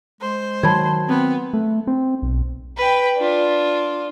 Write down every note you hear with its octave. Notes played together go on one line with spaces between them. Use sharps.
G#3 C5
D#3 F#3 A5 B5 G#6
B3 C4
A3
C4
B1
B4 G5
D4 F4